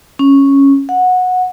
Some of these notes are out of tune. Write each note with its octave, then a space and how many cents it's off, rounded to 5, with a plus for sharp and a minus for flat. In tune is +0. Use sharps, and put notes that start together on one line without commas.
C#4 -5
F#5 -15